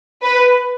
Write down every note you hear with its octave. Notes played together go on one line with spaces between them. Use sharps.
B4